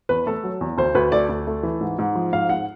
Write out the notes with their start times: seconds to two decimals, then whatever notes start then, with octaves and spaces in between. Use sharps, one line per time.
0.09 E2 B4
0.26 A3 A4
0.44 F#3
0.61 E2
0.78 D2 C5
0.95 D2 B4
1.12 A3 D5
1.29 D2
1.47 A3
1.63 E3
1.81 G#2
1.99 G#2
2.15 F3
2.33 G#2 F5
2.49 G#2 F#5